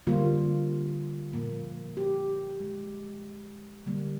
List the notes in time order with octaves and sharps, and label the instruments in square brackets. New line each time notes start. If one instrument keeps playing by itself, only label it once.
[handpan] D3 G3 A#3 F4
A#2 F3 A#3
G4
D#3 G#3
D3 G3 A#3